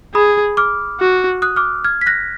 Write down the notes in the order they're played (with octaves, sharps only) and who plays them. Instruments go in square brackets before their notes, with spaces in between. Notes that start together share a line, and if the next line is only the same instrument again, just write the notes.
[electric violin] G#4 [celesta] B5 D#6
[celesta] D6 F6
[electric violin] F#4
[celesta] D#6 F#6
D6 F6
F6 G#6
B6
F#6 A#6